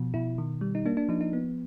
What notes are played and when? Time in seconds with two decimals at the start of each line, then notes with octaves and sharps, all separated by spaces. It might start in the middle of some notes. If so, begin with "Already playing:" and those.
Already playing: B2 F3
0.14 B2 E4
0.38 D#3
0.61 G3
0.75 D#4
0.86 A#3 D4
0.97 D4
1.09 F3 D#4
1.21 D#4
1.33 B3